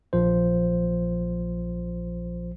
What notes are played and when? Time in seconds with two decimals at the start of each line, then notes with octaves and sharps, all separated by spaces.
0.13 A#1 F3 C5